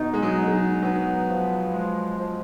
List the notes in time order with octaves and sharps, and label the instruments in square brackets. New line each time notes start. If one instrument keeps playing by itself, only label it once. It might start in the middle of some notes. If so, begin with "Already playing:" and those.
Already playing: [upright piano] B2 [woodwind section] D#4
[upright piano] G#3
F#3
[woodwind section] D#4
[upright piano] G#3
F#3
[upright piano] F#3 [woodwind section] B3
[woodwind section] F3
G#3
F3